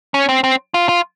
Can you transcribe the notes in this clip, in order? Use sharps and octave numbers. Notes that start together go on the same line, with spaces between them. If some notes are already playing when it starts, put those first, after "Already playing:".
C#4
C4
C4
F4
F4